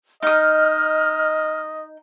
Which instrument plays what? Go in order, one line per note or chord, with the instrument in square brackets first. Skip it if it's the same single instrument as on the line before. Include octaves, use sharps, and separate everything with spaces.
[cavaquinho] D#4 D#6 [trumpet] D#5 [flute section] F6